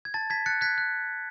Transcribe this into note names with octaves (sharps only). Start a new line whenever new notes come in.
G#6
A5 A6
A5 G#6 B6
F#6 A6 C#7
F#6 G#6 B6
F#6